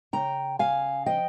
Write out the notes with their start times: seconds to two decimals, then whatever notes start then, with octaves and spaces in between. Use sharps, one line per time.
0.13 C#3 G5 A#5
0.59 C#3 F5 G#5
1.06 F3 D#5 G5